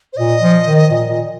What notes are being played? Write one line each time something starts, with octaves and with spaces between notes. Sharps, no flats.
C5
A#2 D#5
F3
D#3
A#2
A#2